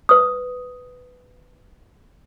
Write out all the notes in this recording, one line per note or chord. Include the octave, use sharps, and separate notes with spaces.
B4 D#6